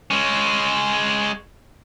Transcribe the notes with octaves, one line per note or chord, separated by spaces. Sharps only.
G#3 C#4